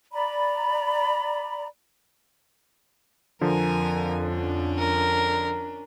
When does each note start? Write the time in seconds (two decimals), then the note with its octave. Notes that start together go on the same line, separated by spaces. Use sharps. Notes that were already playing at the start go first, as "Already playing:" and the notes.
0.13 D5 A#5 B5
3.41 F2 D3 F3 A#4 G#5
4.23 C#4 D4
4.78 A#4